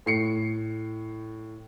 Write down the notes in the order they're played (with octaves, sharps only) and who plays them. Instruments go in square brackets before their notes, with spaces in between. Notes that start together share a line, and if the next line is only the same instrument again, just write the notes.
[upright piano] A2 C7 C#7